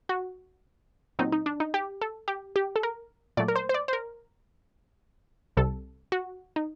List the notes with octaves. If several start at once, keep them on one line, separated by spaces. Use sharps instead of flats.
F#4
A#2 F#3 C4 D#4
D#4
D4
D#4
G4
A4
G4
G4
A4
A#4
A#2 F#3 A3 D5
A#4
C5
C5
D5
C5
A#4
C2 C3 G3 A4
F#4
D#4